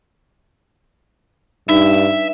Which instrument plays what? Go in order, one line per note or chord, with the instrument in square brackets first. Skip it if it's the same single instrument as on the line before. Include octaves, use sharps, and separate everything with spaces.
[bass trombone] G2 [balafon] D#4 [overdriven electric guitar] E5